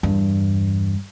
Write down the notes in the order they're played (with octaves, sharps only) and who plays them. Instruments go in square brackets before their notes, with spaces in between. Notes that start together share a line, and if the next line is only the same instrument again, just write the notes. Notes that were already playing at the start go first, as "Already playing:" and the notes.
[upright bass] E2 G2